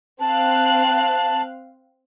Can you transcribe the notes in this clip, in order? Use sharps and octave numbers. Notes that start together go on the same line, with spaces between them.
C4 F5 A5 F#6